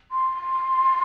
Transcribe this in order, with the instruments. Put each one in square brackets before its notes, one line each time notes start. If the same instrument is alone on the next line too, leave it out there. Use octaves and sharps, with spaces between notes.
[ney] C6